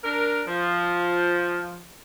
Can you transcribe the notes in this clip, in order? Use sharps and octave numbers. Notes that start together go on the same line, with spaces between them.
D4 A#4
F3